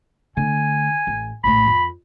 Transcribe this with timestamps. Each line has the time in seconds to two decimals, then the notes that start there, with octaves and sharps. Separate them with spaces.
0.37 D3 A3 G#5
1.07 A1
1.44 A#1 A2 B5
1.67 F2